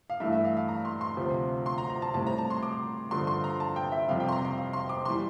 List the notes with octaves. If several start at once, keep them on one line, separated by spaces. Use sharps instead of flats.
F5
G2 E3 A3 E5
E5
F5
F5
A#5
C6
C6
D2 C3 F3
C6
A#5
A#5
A5
A2 G3 C4 A5
A#5
A5
C6
D6
G2 D3 F3 C6
C6
A#5
A5
G5
E5
F2 C3 G3 C4 F5
G5
C6
A#5
C6
F5
C6
D6
E3 G3 C6